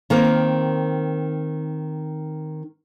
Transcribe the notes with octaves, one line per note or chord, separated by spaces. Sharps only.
D#3 A#3 C4